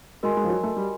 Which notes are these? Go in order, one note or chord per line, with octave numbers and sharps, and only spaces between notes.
G#3 F#4 A#4 D#5 G#5 C6
G#3
F3
F#3
A3
G3